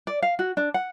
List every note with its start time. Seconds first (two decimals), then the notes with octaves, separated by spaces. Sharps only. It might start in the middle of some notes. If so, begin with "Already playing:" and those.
0.07 D5
0.22 F5
0.39 F#4
0.57 D4
0.74 F#5